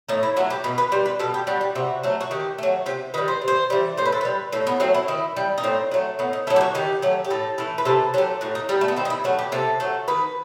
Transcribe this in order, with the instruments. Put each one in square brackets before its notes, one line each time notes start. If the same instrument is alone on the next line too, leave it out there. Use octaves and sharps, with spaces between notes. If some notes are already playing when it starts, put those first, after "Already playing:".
[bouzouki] A2 D#4
E4
F#3 A3 F#4
G4
B2 B4
B4
G3 C5
B4
B2 A4
G4
G3 F#4
G4
C3 F#4
F#3 A3
F#4
D#3 G4
F#3 A3
C3 G4
D#3 G3 B4
C5
C3
C5
E3 G3
A2 C5
B4
A4
G3 B4
A2 A4
B3
F#3 A3 C4
E4
D#3 E4
G3
D#4
A2 C4
F#3 A3
A2 B3
D#4
F#3 A3 E4
G4
F#4
D#3 G4
F#3 A3
G4
A2 A4
E3 A3
B4
C3 A4
F#3 G4
A3
A2 F#4
D#4
G3 B3
A3
B3
D#3 C4
D#4
E4
F#3 A3 F#4
G4
C3 A4
F#3 A3
D#3 B4